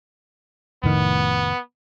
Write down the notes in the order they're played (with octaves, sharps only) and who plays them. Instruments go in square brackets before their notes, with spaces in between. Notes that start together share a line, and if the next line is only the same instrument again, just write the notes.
[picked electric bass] F1 A2 D#3 [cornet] B3